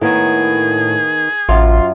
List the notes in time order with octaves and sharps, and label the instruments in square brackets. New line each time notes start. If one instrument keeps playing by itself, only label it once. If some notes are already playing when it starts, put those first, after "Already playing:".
[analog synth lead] A2 [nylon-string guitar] D#3 A#3 B3 [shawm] G#4
[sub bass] A1 [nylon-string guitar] F#2 [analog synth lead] F4